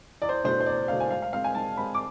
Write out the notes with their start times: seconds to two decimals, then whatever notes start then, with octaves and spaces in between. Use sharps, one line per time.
0.22 E2 D5
0.29 C5
0.44 B2 A3 D4 C5
0.60 C5
0.66 E2 D5
0.88 B2 A3 D4 F5
1.00 G#5
1.10 G#2 F5
1.22 F5
1.33 G#3 C4 F5
1.44 G#5
1.55 G#2 A5
1.77 G#3 C4 B5
1.94 D6